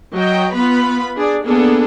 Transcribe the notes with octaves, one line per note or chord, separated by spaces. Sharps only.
F#3 D#5 G5
B3 F4 B4 B5
D4 G#4 D5
A#3 B3 D4 G#4 A4